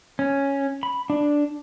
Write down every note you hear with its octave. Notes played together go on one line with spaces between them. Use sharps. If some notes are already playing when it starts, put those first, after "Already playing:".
C#4
B5
D4